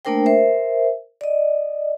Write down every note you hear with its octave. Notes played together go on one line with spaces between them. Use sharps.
A3 A#3 D4 A#4 C5 G5
A#4 C5 E5
D5 D#5